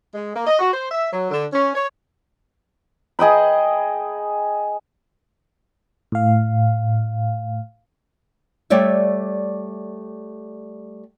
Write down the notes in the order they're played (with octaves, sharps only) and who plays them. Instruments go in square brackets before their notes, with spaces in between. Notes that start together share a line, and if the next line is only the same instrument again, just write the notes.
[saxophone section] G#3
A#3
D#5
F#4
C5
E5
F#3
D3
C#4
C#5
[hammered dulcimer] G#4 D#5 G5 B5
[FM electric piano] A2 F5
[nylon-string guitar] G3 A3 C#5 D5 E5